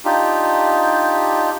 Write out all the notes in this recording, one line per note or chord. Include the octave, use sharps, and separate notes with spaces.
D4 D#4 F4 G4